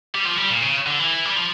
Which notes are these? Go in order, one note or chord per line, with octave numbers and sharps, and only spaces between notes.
G3
F3
G3
A#2
C#3
D3
E3
G3
F3